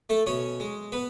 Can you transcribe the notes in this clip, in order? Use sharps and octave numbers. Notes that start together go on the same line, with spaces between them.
A3 A4
B2 C#4 C#5
G#3
B3 B4